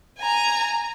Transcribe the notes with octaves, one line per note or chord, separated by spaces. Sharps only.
G#5 A#5